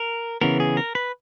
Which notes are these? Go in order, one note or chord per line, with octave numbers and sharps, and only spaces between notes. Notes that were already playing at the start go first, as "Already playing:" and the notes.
Already playing: A#4
C#3 E3 B3 A#4
G#4
A#4
B4